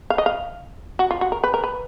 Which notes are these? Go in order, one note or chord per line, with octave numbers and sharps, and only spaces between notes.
F5
D#5
F5
F#4
F4
F#4
A#4
B4
A#4
B4